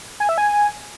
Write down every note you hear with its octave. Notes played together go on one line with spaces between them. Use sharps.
G#5
E5
G#5